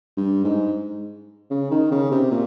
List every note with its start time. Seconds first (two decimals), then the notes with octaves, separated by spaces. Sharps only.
0.17 G2
0.44 G#2
1.50 C#3
1.71 D#3
1.91 C#3
2.11 C3
2.31 A#2